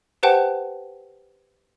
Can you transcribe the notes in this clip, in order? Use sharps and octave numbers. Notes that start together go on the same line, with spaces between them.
G4 B4 C5 F#5 G5 A5